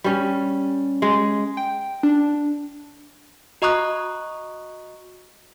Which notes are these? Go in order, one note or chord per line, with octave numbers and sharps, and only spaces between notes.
G3 C#4
G#3
G5
D4
F#4 D#5 A#5 C#6 D#6 F#6